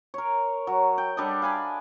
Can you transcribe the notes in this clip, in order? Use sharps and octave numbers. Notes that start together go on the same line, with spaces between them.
A#4 C#5
F#3
G5
G3 D4 A4 D#5
F5 G#5 B5